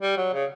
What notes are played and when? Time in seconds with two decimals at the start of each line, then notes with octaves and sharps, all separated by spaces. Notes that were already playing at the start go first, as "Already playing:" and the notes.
0.02 G3
0.17 F#3
0.34 C#3